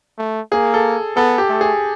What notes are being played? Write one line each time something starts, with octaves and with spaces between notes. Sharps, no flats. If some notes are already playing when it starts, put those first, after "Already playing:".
A3
A#3 G#4
A4
B3 A4
G4
A3
G#4